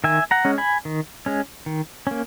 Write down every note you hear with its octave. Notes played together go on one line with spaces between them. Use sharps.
D#3 E5 G#5
F#5 A#5
G#3 C#4
G#5 B5
D#3
G#3 C#4
D#3
A#3 C#4